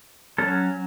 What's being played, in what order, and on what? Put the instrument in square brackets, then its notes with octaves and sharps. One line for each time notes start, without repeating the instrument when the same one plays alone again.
[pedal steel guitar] F#3 C#4 A4